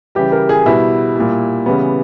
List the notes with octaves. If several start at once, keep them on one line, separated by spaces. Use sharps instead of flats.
C#3 E3 G3 G4
A#4
G#4
B2 G3 E4
A#2 G3
C#3 E3 G3 B3